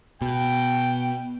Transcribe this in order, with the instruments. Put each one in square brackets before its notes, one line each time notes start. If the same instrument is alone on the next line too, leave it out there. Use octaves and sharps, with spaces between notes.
[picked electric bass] B2 [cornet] G5